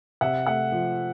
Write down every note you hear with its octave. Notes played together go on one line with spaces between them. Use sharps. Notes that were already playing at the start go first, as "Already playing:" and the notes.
C3 E5 F#5
A3 E5 F#5
F3